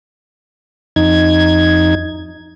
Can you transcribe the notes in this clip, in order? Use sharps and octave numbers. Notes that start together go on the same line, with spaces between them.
F2 D#4 G#6